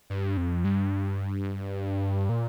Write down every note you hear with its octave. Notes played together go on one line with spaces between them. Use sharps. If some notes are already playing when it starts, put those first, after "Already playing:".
G2
F2
G2
A#2